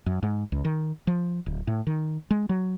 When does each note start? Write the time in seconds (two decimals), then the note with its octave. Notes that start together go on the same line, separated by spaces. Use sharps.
0.06 F#2
0.23 G#2
0.52 C#2
0.65 D#3
1.07 F3
1.46 D1
1.67 A2
1.87 D#3
2.31 G#3
2.49 F#3